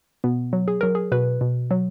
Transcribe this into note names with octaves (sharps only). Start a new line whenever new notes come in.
B2 B3
F#3
G#4
F#3 A#4
G#4
B2 B4
B2
F#3